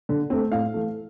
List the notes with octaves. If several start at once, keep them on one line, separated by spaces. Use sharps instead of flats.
D3
A3 C4
A2 F5
E3 A3